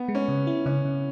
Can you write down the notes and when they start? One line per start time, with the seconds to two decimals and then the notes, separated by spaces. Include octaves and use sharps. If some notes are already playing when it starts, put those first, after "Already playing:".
Already playing: B3
0.08 G#3
0.15 C#4
0.28 C#3
0.47 E4
0.66 C#3 C#4
0.85 C#3